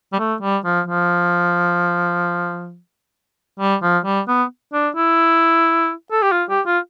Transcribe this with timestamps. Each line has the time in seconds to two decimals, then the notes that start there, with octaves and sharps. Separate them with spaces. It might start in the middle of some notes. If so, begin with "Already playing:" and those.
0.13 G3
0.19 A3
0.42 G3
0.65 F3
0.87 F3
3.60 G3
3.82 F3
4.05 G3
4.28 B3
4.73 D4
4.96 E4
6.11 A4
6.22 G4
6.32 F4
6.49 G4
6.66 F4